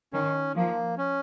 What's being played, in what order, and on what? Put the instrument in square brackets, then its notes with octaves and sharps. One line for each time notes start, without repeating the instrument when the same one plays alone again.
[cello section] D#3 [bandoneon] C#4
[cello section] F3 [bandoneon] A#3
[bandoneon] C#4